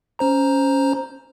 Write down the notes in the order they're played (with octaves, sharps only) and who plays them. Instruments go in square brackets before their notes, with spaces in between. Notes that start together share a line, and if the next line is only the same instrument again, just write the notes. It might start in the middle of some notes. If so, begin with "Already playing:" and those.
[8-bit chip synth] C#4 C5 A#5